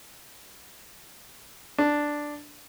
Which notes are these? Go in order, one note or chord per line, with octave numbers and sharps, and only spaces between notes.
D4